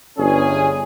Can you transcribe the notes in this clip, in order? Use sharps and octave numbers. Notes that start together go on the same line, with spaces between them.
G1 C#4 G#4